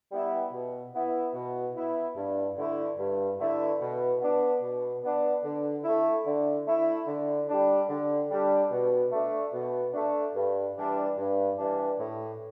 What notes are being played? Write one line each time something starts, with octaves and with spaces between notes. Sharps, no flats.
G3 B3 E4
B2
B3 E4
B2
B3 E4
G2
D3 A3 E4
G2
D3 A3 E4
B2
B3 D4
B2
B3 D4
D3
A3 E4
D3
A3 E4
D3
G3 D4
D3
G3 D4
B2
A3 D4
B2
A3 D4
G2
E3 G3 D4
G2
E3 G3 D4
A2